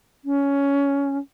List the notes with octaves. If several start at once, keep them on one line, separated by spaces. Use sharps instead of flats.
C#4